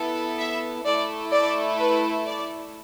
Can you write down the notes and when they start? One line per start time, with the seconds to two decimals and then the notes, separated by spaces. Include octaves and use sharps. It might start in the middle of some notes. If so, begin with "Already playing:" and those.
Already playing: B3 E4 A4
0.38 E5
0.85 A3 E4 A4 D5
1.32 D5
1.79 B4
2.27 D5